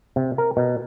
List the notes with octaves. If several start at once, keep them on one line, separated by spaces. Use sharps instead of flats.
C3
A#4
B2